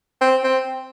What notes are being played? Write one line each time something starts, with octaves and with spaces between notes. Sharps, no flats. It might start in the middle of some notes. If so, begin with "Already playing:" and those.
C4
C4